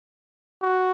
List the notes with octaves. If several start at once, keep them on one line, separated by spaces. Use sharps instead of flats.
F#4